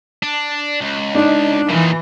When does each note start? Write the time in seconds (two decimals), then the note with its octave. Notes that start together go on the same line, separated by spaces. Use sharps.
0.23 D4
0.81 C#2
1.15 D4 D#4
1.69 A#2 D#3 E3